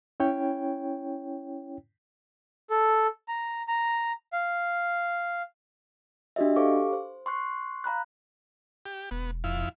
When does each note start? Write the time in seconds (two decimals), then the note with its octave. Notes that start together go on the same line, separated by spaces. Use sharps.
0.20 C#4 E4 C#5 G5
2.70 A4
3.28 A#5
3.68 A#5
4.33 F5
6.36 D4 F#4 G4 D#5 E5
6.56 G4 A4 C5 F5 C#6 D6
6.93 C5
7.26 C6 C#6 F#6 C7
7.84 F5 A#5 B5 F#6
8.86 G4
9.11 E1 B3
9.44 F2 E4 F5